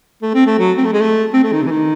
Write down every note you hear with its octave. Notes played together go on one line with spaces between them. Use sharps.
A3
C4
A3
F#3
C4
A3
G#3
A3
C4
A3
D#3
C3
E3
D#3